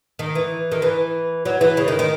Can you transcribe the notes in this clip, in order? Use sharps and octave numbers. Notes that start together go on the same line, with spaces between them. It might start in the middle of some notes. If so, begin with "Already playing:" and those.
D#3
E3
D#3
E3
F#3
E3
C#3
D#3
D#3